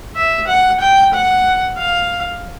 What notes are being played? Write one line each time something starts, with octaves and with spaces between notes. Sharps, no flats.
E5
F#5
G5
F#5
F5